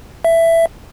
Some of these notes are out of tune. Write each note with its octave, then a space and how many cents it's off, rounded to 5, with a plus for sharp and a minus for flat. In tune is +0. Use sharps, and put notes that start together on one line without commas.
E5 +10